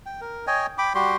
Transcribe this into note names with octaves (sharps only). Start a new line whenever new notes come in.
G5
A#4
C#5 D#5 G5 G#5
G5 B5 D6
G3 F#4 G4 C6